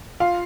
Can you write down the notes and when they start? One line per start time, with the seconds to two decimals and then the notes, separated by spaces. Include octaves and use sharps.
0.20 F4 F5